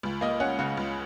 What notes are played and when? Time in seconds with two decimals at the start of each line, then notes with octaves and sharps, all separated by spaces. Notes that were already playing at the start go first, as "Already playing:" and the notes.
0.03 C#2
0.21 A#3 D#5
0.40 C#4 F#5
0.59 C#3 F#5
0.77 C#2